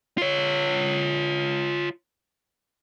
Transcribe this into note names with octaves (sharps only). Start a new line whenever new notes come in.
F4 C#5